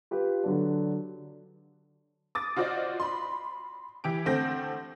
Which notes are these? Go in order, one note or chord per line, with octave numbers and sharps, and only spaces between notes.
F4 G4 B4
D3 F#3 D4
D6 D#6 A6
F4 F#4 C5 D5 D#5
B5 C6
E3 G4 D7
D2 A3 C4 G6 A#6